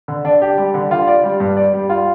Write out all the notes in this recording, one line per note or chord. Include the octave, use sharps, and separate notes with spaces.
D3
D4
G4
G3
D3
F4
D5
G3
G2
D5
G3
F4